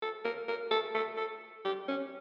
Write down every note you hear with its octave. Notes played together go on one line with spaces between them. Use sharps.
A4
A#4
A#4
A4
A4
A4
G4
C#4